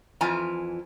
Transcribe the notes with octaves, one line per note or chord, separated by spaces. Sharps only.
F2 E3 F4 G#5 A#5